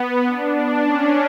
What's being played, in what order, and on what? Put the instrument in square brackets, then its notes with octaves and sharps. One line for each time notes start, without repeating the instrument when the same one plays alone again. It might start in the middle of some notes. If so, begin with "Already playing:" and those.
Already playing: [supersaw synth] B3
D4
C#4